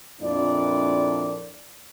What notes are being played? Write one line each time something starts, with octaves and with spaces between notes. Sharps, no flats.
F2 A#2 A#3 D4 E4 D5